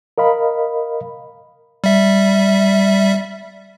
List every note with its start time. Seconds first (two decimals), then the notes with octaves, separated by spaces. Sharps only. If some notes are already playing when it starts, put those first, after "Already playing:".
0.18 A#4 D#5 F5 B5
1.84 G3 E5